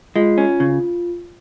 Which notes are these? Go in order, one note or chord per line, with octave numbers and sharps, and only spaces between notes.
G#3 F4
C#4
C#3